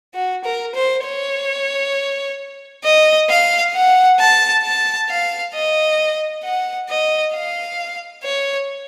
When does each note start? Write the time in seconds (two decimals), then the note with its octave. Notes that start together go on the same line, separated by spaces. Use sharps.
0.14 F#4
0.44 A#4
0.75 C5
1.05 C#5
2.84 D#5
3.29 F5
3.75 F#5
4.20 A5
4.64 A5
5.09 F5
5.54 D#5
6.44 F#5
6.89 D#5
7.33 F5
8.23 C#5